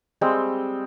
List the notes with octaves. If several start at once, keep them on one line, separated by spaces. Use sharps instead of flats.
G3 G#3 C4 E6